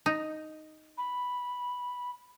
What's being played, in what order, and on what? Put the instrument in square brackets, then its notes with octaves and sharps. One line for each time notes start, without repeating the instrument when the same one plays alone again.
[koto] D#4
[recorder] B5